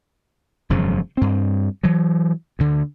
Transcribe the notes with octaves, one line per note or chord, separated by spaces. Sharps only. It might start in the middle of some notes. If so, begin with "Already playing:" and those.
E1 F#2 C#3 F3
G2 C4
E3 F#3
D2 D3